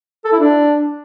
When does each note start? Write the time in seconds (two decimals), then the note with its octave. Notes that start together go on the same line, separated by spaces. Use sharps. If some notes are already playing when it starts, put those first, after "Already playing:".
0.25 A4
0.32 E4
0.40 D4